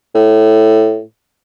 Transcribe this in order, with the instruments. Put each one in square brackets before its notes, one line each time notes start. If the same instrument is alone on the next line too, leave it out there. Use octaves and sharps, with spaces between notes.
[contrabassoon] A2